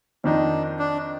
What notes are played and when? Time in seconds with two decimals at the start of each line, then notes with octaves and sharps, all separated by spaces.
0.24 F2 D#3 A#3 D4 D#4
0.79 D4